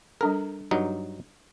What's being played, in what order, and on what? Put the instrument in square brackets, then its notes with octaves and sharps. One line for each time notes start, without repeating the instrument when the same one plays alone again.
[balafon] G3 D4 A4 [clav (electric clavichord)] A#4
[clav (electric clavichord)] G2 F#3 D#4